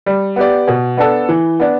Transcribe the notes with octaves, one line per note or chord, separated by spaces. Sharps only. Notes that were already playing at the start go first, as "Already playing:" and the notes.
G3
B3 G4 D5
B2
B3 D4 A4
E3
B3 D4